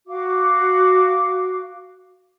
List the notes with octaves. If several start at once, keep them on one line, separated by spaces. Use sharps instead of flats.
F#4 F5 D6